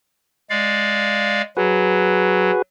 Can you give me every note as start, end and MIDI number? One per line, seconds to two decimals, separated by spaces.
0.50 1.42 56
0.50 1.42 74
0.50 1.42 77
1.57 2.51 54
1.57 2.62 66
1.57 2.62 68
1.57 2.62 71